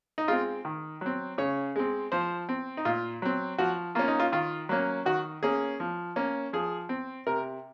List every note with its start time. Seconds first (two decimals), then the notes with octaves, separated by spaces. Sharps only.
0.18 D#4
0.28 G#3 C4 F4
0.65 D#3
1.01 F#3 C4
1.38 C#3 C#5
1.76 G#3 C4
2.12 F3 C5
2.49 C4
2.77 D#4
2.85 A#2 F4
3.22 F#3 C4
3.58 F3 F#4
3.95 A#3 C#4 F4
4.08 D#4
4.20 F4
4.32 D#3 F4
4.69 F#3 A#3 C#4
5.06 D#3 F#4
5.43 A#3 C#4 G#4
5.80 F3
6.16 A#3 C#4
6.53 F3 G#4
6.89 C4
7.27 C3 A#4